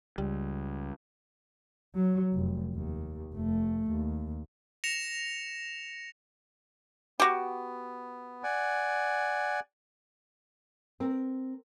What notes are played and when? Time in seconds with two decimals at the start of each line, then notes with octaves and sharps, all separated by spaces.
0.18 C#2 G3
1.95 F#3
2.33 F1
2.75 D#2
3.33 F1 A3
3.90 D#2
4.84 A#6 C#7 E7 F7
7.20 B3 F#4 G4
8.43 D5 F#5 G#5
11.00 C4 A#4